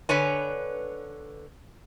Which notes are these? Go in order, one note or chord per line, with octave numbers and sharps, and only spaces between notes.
D3 B4 C#5 G#5